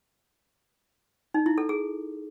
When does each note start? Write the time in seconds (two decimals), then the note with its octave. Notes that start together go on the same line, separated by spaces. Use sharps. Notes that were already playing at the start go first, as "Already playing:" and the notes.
1.34 D#4
1.46 E4
1.58 A4
1.69 G#4